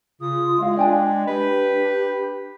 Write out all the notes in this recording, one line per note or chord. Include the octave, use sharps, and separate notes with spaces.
C#3 F4 D#6
G#3 E4 F5
D4 D5 G5 G#5
D4 G4 B4